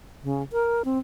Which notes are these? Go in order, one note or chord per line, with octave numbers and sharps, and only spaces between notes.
C#3
A#4
C4